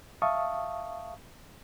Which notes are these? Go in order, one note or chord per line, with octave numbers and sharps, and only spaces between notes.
E5 F5 A5 C#6 D#6